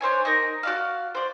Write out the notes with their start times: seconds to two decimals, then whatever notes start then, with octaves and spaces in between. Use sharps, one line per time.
0.01 D4 C5 C#5 G#5
0.25 D#4 A#4
0.63 F#4 D5 F5
1.15 C5 D5